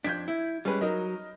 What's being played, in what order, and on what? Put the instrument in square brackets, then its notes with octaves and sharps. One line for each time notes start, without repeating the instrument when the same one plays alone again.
[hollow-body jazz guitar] F2 D4 [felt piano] G6 G#6 B6
[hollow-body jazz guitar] E4
[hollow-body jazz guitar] G3 G#3 [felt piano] C#4 B4
[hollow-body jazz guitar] F#3 [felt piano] D#4 A#4 D#5